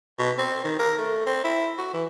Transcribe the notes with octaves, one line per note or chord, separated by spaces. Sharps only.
B2
C4
D#3
A#4
A3
C4
E4
F#4
E3